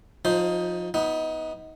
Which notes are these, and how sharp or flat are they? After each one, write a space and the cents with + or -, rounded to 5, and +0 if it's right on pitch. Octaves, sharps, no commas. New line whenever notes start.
F3 +30 D#4 +10 C5 +0
B3 +0 D#4 +25